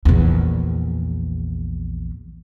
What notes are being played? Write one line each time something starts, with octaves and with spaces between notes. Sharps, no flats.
A#1 E2